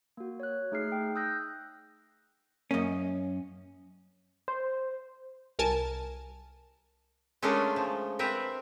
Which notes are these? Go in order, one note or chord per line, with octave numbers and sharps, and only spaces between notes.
A#3 F#4
C#5 F#6
A3 D#4 G#4 F6 C7
G5
D#6 E6 F#6 G6 A#6
F#2 A#3 C#4 D#5
C5
C2 A#4 G#5 A5
G#3 A3 C#4 D4 F4 A#4
F3
C4 A#4 B4 E5